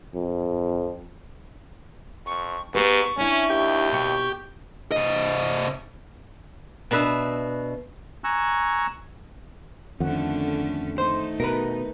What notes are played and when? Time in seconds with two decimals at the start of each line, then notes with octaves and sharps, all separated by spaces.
0.15 F2
2.26 F2 C#6
2.75 G#2 B3 G4 B4 C#6
3.17 C#4 D4 E4
3.50 D#2 G4
3.92 B2 G5 C#6
4.92 C3 D#5
6.91 B2 D4 B4 E5
8.24 G#5 A#5 C#6 E6 F#6
10.00 F2 D3 D#3 A3 C#4 F#5
10.98 A3 D#4 C5
11.40 B2 A#4 B4